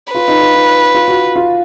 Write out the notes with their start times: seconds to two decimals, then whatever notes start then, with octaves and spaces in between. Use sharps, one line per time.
0.14 F4 B4
0.28 D#4
0.41 F4
0.54 D#4
0.95 F4
1.08 F#4
1.36 F4